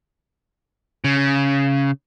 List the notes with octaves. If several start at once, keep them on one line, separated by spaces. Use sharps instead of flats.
C#3